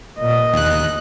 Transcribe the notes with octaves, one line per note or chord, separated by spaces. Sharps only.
A#2 D#5
D#2 F#6